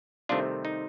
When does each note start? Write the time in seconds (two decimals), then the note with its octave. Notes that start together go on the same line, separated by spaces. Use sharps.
0.29 C2 C3 D#3 A3 C4 D4 F4
0.65 D#4